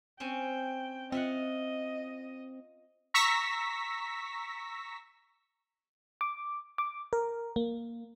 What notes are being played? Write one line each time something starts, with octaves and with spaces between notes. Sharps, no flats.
C4 C#4 G5 G#5
C4 F4 D#5 E5 F#5
A#5 C#6 E6 A#6 B6
D6
D6
A#4
A#3